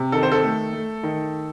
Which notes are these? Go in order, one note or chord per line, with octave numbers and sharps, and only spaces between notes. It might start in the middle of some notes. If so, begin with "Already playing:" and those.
Already playing: C3
D#3 A4
C5
A4
A3
A3
D#3